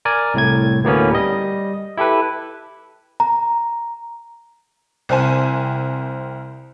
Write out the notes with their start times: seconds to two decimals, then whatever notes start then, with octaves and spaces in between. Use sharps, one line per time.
0.05 A#4 D5 G#5
0.34 C2 A2 G#6
0.84 D2 A2 A#3 B3 C#4
1.11 G3 D#5
1.97 E4 G4 A4 B4
3.20 A#5
5.09 C2 C4 C5 G#5